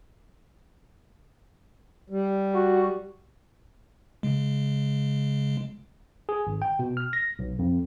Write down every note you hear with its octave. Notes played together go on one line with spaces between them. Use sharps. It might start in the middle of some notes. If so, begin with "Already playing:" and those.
G3
F#4
C#3 G#3
G#4
G#1
G5
B2
F6
A#6
B1
F2